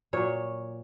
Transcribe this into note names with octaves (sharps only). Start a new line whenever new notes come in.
A#2 F#3 C#5